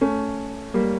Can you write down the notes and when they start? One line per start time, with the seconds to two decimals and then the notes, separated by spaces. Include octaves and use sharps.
0.01 A3 C#4
0.74 G3 A#3